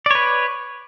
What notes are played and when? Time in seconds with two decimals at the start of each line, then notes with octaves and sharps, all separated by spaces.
0.06 D5
0.11 C#5
0.15 B4